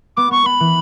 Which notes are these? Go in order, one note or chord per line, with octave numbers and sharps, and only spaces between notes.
B3 D6
B3 C#6
B3 B5
E3